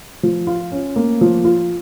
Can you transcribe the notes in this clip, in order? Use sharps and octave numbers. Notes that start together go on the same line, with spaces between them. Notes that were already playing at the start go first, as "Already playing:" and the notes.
F3
F4
C#4
A#3
F3
F4